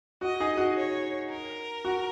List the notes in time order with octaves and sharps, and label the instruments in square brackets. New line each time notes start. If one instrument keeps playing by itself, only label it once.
[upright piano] F#4 [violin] D#5
[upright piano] D#4 G#4
F#4
[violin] C#5
A#4
[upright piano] F#4